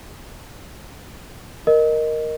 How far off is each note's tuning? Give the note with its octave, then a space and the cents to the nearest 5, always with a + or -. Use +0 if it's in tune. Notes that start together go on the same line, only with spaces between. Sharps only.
A#4 +0 D#5 -10